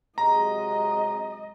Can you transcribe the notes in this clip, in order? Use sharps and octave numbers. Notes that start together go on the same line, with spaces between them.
C3 F#3 G#3 D#5 A#5